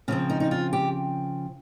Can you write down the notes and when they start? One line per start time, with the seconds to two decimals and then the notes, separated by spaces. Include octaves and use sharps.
0.08 C#3 F3 C4 C#4
0.30 D#4
0.40 D#4
0.51 F4
0.73 G4